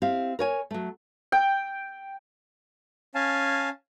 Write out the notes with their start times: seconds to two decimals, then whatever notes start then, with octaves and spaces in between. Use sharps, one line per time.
0.02 C4 E4 G4 F5
0.39 A#4 C#5 G#5
0.71 F#3 A3
1.32 G5
3.15 C#4 F5 G#5 A5